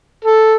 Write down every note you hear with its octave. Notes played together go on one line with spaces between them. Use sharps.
A4